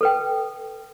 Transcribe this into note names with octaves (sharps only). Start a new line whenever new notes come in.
A4 B4 G5